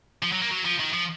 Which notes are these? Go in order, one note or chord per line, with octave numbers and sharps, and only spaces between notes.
F3
F#3
A#3
F#3
F3
D#3
F3